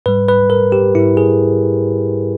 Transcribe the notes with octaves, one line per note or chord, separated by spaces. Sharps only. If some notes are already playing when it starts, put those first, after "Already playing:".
G#2 G3 B4
B4
A#4
G4
G#2 G3 E4
G#4